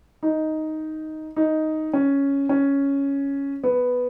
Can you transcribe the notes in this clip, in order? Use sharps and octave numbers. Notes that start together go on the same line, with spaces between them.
D#4
D#4
C#4
C#4
B3